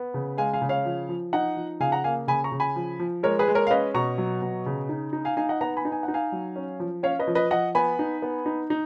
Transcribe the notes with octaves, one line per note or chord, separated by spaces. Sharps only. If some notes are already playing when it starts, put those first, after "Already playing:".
Already playing: B3
C#3
G#3 F5 G#5
F5 G#5
C#3
C#5 F5
F3
F3
D#4 D#5 F#5
F3
C#3 F5 G#5
F#5 A#5
A#3 F5 G#5
C#3 G#5 B5
A#5 C#6
C#3
G#5 B5
F3
F3
G#3 A#4 C#5
G#4 B4
G#3
A#4 C#5
F5
C#4 B4 D#5
B2 A#5 C#6
F#3
B2
C#3
D#4
D#4
F5 G#5
D#4 F5 G#5
D#5 F#5
B3 F#5 A#5
G#5 B5
D#4
G#5
F#5
D#4
F5 G#5
F#3
C#4
F3
C#4 C#5 F5
B4 D#5
F3
B4 D#5
F3 D#5 F#5
B3 G#5 B5
D#4
B3
D#4
D#4